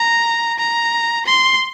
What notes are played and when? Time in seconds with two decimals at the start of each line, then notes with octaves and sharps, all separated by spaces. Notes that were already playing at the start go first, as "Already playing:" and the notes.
Already playing: A#5
0.58 A#5
1.26 C6